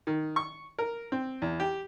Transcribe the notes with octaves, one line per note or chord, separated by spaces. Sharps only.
D#3
C#6
A#4
C4
E2
G4